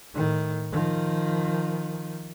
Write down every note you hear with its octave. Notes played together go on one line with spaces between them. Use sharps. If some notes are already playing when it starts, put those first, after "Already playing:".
A2 D#3
D#3 F3